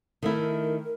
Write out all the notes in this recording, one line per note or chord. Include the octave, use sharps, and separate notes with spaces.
D#3 A3 E4 A#4